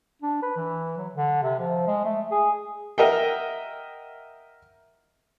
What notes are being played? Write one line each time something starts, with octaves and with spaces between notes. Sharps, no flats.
D4
B4
E3
F#3
D3
C3
F3
G#3
A3
G#4
A#4 D#5 E5 F#5 G5